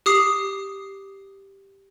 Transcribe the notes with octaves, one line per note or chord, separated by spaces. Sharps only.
G4 D#6 C7